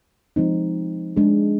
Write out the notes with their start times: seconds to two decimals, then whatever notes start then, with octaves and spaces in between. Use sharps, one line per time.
0.36 F3 G#3 C4 D#4
1.16 G#3 D4 G#4